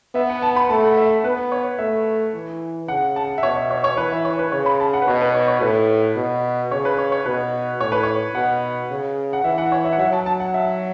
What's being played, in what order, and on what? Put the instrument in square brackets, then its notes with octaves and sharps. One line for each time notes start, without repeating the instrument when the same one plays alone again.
[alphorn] B3 [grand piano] E5
[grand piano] F#5
A5
B5
[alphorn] A3 [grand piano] A5
[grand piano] F#5
E5
[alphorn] B3 [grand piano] B4
[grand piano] C#5
[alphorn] A3 [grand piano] E5
[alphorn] E3
[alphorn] C#3 [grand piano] F#5
[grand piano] A5
E5
[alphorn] B2 [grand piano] C#5
[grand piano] E5
C#5
C#5
[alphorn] E3 [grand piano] B4
[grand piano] E5
C#5
B4
[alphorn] C#3 [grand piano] C#5
[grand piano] B5
A5
F#5
B4
[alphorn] B2 [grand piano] C#5
[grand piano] B4
C#5
C#5
[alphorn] A2 [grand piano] B4
[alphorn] B2
[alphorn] C#3 [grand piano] C#5
[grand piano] B4
C#5
C#5
[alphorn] B2 [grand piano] B4
[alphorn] A2 [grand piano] C#5
[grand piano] B4
C#5
[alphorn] B2 [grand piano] F#5
[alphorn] C#3
[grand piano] F#5
[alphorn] E3 [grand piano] E5
[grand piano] F#5
C#5
E5
F#5
[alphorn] F#3 [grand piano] E5
[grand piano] A5
A5
F#5
E5